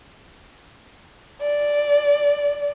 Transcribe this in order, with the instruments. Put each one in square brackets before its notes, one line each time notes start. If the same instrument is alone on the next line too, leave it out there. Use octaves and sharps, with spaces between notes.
[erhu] D5